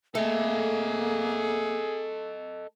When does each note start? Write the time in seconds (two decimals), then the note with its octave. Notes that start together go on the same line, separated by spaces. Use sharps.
0.15 A3 A#3 G#4 A4 D#5